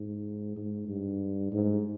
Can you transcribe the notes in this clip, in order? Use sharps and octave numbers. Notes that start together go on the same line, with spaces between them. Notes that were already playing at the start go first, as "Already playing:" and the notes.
Already playing: G#2
G#2
G2
G#2